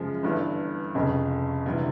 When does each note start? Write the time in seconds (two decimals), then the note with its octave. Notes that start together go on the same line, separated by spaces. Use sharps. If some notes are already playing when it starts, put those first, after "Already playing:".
Already playing: F#2 C#3 F3 G#3
0.23 G1 G2 E3 A3
0.95 F1 F2 C#3
1.66 D2 C3 E3 G3